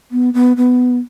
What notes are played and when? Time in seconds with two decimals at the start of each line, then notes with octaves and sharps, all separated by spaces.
0.12 B3
0.34 B3
0.57 B3